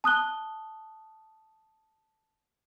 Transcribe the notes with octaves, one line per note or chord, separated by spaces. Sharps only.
A5 D#6 F#6 G7